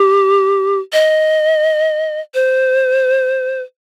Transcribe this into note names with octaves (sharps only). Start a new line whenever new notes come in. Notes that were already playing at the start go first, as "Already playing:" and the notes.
Already playing: G4
D#5
C5